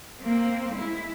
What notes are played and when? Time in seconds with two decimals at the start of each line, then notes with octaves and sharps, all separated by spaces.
0.22 A#3 C4
0.75 G#3 E4